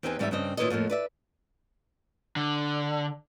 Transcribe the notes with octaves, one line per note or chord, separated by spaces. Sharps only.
E2 C4 D#4 G4 B4 G#5
G#2 E3 G3 D#4 A#4 E5
G2 C#3 G3 C4 D#5
A#2 D#3 E4 B4 C#5 D#5
F2 A2 F3 A#3
B4 D5 E5
D3